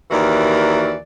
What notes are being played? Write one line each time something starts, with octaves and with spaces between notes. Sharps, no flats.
D#2 E3 F#4 A#4 D5